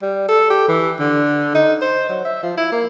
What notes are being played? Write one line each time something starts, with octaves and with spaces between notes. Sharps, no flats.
G3
A4
G4
E3
D3
D#4
C5
F#3
E5
F3
E4
A#3